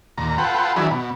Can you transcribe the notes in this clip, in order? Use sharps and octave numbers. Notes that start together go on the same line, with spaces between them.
D#2 A#2 A#5
F4 A4 B4 F#5 G5 C6
D#3 E3 F#3 D4 E4 G#4
B2